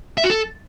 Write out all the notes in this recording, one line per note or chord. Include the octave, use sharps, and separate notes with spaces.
E5
F#4
A4